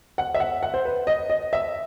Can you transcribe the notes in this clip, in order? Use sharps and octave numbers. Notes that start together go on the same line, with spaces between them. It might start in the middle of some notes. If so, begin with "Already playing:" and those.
F#5
E5
F#5
F#5
C5
B4
D#5
D#5
E5